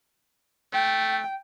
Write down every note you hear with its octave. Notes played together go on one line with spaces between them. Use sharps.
A3 G5